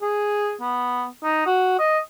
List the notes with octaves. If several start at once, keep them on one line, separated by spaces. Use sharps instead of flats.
G#4
B3
D#4
F#4
D#5